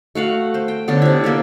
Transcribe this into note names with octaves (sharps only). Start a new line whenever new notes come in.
A3 F#4 F5 F#5
C5
G5
D3 B3 C#4 D4
C3 E4
A#3 G4 A4